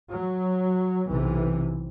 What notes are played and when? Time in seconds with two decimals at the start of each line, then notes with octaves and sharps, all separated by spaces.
0.11 F#3
1.07 B1 C3 E3